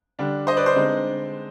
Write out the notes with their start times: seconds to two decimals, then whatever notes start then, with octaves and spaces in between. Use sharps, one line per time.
0.19 D3 G3 D4
0.47 C5 D#5
0.57 B4 D5
0.66 C5
0.76 D3 G#3 C4 D#4